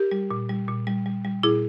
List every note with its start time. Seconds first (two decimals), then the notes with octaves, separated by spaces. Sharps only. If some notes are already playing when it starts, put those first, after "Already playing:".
Already playing: G4 A#4
0.11 G3
0.31 A#2
0.49 G3
0.68 A#2
0.87 G3
1.06 G3
1.25 G3
1.43 A#2 E4 G#4